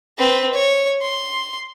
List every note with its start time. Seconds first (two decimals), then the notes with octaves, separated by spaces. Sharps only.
0.18 C4 B4
0.53 C#5
1.02 C6